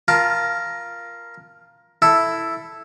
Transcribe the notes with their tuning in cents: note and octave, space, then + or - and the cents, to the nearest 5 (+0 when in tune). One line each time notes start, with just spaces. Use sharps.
F4 -5 A#4 +15 A5 +20
E4 +0 A4 +0